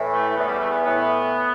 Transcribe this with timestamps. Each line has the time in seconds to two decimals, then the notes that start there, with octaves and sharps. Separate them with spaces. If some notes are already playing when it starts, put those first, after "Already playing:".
Already playing: A2 E3
0.13 A3
0.36 E2 E3 B3
0.48 G3
0.60 A3
0.71 B3
0.83 A2 E3 B3